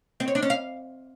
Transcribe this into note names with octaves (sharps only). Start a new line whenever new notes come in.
C4
C#5
D4
C#4
F5